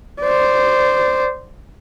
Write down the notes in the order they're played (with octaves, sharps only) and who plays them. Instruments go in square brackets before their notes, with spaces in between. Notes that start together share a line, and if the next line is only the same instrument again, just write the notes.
[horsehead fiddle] C5 D5